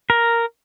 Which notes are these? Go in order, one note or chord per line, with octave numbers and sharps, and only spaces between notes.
A#4